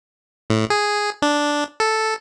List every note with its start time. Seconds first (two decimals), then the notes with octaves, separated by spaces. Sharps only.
0.50 A2
0.70 G#4
1.22 D4
1.80 A4